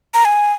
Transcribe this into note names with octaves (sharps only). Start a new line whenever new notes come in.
A#5
G#5